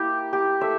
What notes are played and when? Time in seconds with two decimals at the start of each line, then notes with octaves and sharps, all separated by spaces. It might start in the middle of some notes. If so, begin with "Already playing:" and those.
Already playing: A#3 E4 G4
0.33 G4
0.61 A3 E5